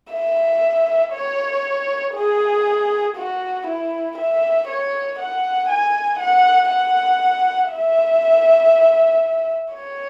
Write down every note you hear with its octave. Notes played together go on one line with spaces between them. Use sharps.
E5
C#5
G#4
F#4
E4
E5
C#5
F#5
G#5
F#5
F#5
E5
C#5